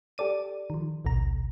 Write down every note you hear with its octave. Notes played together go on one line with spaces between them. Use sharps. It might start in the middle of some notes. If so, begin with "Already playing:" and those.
G4 A4 D5 D#7
D#3 F3
A1 D2 B2 A#5